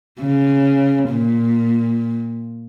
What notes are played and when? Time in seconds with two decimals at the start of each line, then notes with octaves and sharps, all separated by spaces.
0.21 C#3
1.10 A#2